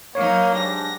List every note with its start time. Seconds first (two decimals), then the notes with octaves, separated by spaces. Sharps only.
0.15 F#3 A#3 D#4 C#5
0.53 G#2 G3 D4 A#6